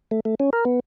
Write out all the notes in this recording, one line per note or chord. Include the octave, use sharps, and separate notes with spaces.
A3
A3
C#4
A#4
B3